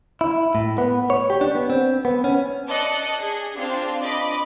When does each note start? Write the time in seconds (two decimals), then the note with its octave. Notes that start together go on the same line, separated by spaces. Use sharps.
0.21 E4
0.55 A2
0.78 B3
1.10 C#5
1.30 G4
1.41 D4
1.55 B3
1.70 C4
2.05 B3
2.24 C#4
2.69 D5 D#5 A5 F#6 C#7
3.16 G#4
3.56 C4 D4 F4
4.01 D#5 B5 D6